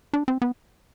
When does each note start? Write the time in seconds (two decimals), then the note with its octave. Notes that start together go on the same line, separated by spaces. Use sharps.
0.13 D4
0.28 C4
0.42 B3